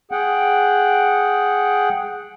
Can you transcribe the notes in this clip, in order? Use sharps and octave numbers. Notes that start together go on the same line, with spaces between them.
G#4 F#5 G5